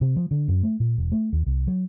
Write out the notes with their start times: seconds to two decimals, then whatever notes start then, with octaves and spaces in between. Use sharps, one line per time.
0.01 C3
0.16 F3
0.31 D3
0.48 F#2
0.63 A3
0.80 A#2
0.98 E1
1.12 A3
1.33 D#2
1.46 C2
1.67 F#3